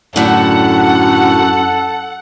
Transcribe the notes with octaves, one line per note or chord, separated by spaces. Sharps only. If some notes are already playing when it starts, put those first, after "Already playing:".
F#2 A2 D3 A4 F#5